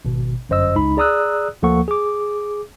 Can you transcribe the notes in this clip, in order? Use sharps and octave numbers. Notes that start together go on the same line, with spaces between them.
G#1 B2
G1 F#2 C5 D#5 E6
C#2 D#4 B5
G#4 D5 A#5 D#6 E6 F#6
D2 F3 A#3 A4 F#5 C#6
G#4 D6